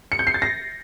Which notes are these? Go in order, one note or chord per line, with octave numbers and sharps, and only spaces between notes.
C#7
G6
C7
A6
A#6